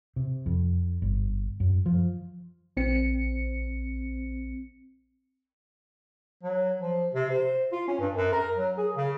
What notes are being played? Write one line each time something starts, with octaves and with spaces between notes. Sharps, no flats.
C3
F2
G1
F#2
F3
A#1 C4 C#7
F#3
F3
C3
C5
F4
C#4
G2
F#2
A#4
F#3
G#4
C#3